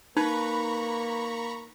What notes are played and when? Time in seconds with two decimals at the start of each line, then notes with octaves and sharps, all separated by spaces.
0.17 A#3 D#4 B4 A#5 B5 C#6